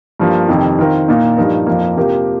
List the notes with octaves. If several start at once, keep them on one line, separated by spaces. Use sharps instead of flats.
G2 F3 A#3
F2 C3 D#3
D#3 C4 F4 A#4
A#2 A#3 D#4
G2 F3 D#4 A#4
F2 F3 A#3
C3 F3 A#3 G4 A#4